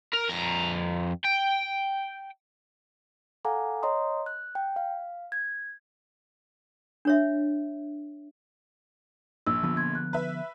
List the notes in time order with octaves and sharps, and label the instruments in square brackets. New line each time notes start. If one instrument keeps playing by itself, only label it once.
[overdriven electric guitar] A#4
F2 A#5
G5
[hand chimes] A4 F5 F#5 G#5 A#5 D6
C#5 D#5 A#5 C6 D#6
F#6
G5
F5
G#6
[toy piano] D4 C#5 E5
[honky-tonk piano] A#1 [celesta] E6
[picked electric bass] D3 F3 B3
[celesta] C6 G#6
F#6
[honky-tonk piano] B4 E5